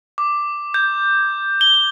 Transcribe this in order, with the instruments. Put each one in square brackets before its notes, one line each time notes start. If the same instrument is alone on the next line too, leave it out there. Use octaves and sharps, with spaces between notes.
[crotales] D6
G6
G7